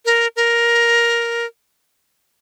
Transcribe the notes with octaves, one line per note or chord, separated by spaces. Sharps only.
A#4
A#4